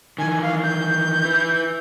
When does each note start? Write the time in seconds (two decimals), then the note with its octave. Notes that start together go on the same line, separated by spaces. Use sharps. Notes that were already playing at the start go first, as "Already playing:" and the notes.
0.18 D#3 E3 G#5
0.42 F5
0.63 G6
1.25 E4 B4